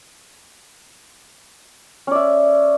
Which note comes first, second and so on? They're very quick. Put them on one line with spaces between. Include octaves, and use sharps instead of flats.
C#4 D5 E5